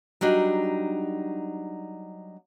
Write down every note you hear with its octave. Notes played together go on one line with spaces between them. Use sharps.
F#3 G3 D4 D#4